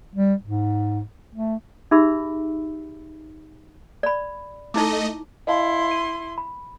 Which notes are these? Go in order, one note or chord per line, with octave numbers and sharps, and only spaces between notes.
G3
G#2
A3
D#4 G4 G#4 E5 B5 E6
D5 B5
A3 D#4 E4 D#5 D6
E4 D#5 F5 A5 C6
D#7
B5